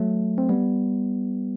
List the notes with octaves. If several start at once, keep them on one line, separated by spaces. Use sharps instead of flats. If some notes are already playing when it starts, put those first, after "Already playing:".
Already playing: F#3 A3
C4
G3 B3